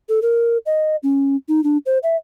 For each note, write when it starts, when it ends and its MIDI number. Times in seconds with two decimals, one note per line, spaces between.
0.09 0.20 69
0.22 0.58 70
0.66 0.96 75
1.03 1.36 61
1.49 1.63 63
1.64 1.78 62
1.86 1.98 72
2.03 2.16 76